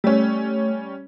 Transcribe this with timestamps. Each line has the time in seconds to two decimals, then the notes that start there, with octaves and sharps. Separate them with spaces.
0.04 G3 A3 C#4